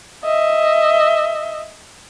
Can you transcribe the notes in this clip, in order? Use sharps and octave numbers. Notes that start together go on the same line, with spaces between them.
D#5 E5